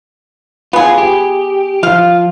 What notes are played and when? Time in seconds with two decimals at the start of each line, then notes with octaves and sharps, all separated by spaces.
0.73 B3 F4 G#4
0.98 G4
1.83 F3 F4 F5